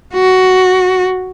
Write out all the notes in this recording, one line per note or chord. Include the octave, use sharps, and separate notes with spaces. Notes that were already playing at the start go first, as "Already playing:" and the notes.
F#4